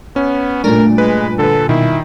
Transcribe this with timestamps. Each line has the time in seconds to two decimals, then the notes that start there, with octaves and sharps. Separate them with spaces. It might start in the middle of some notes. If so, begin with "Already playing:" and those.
0.16 B3 C#4
0.64 G2 A#2 A3 D4 A#4
0.98 G#3 B4
1.39 D3 A4 B4
1.69 B2 D#3 E4